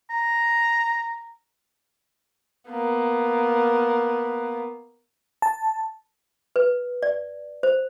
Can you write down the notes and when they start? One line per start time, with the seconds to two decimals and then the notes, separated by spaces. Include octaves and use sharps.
0.10 A#5
2.70 A#3 B3
5.42 A5
6.56 B4
7.03 D5
7.63 C5